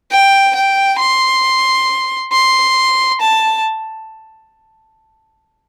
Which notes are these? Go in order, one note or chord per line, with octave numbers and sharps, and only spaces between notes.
G5
G5
C6
C6
A5